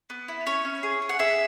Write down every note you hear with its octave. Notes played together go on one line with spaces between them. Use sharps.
B3
E4
C#4 C#5
C#4
G#4
G#4
F#5
G#4 E5